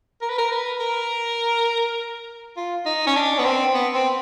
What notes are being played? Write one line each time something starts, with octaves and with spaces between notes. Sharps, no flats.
A#4
B4
A#4
B4
A#4
F4
D#4
C#4
D4
B3
C4
B3
C4